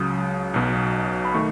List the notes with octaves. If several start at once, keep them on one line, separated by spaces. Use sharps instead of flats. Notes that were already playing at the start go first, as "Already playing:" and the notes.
Already playing: C#2 C#3 F#3 D#6
B1 B2 F#3
B5
D#3 A3 C#6